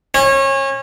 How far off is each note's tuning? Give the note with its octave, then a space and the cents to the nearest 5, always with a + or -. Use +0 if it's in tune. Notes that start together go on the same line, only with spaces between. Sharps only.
C#4 -30